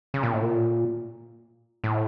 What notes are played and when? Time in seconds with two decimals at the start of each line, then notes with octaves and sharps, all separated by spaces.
0.14 C#3
0.23 A#2
0.33 A2
0.42 A#2
1.84 A2